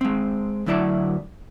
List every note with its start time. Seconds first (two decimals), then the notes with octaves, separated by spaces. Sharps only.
0.01 G#3 C4
0.66 D2 F#3 E4 D5 A5